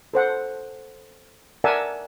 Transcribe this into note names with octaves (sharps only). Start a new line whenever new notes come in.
A4 C5 F#5
A#4 D5 E5 F#5 G#5 A5